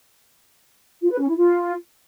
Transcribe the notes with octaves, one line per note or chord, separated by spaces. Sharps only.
F4
B4
C#4
E4
F4